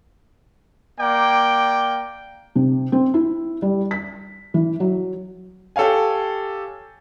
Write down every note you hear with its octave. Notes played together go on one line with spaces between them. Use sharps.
A#3 D5 G5
C3
C4
E4
G3
B6
E3
F#3
G4 A4 C#5 F5 G#5